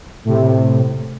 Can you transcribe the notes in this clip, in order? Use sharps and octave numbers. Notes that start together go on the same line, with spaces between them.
A2 C3